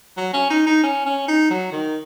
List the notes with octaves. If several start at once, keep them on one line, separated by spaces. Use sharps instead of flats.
F#3
C#4
D#4
D#4
C#4
C#4
D#4
F#3
D#3